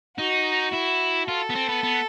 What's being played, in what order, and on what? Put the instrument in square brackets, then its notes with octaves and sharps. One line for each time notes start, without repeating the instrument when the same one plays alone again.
[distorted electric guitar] D#4 [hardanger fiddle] F#4
[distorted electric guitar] E4
[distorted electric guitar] F4 [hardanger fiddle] A4
[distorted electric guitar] B3
C4
B3
B3